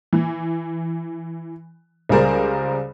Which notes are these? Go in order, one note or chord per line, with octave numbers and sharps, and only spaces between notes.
E3
C#2 G3 G#4 A#4 C5 D5